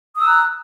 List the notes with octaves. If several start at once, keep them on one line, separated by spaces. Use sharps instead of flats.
A#5 D#6 E6 F#6